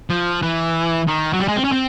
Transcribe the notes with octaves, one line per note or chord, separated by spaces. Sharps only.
F3
E3
D#3
F#3
G3
G#3
C4
C#4
C4